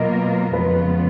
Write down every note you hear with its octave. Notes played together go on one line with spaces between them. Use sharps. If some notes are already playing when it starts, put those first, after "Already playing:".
Already playing: B2 F#3 A#3 F4 A#4 D#5
F2 C#3 G#3 B3 F4 B4